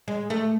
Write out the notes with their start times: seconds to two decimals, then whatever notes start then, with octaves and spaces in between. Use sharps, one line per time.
0.08 G#3
0.30 A3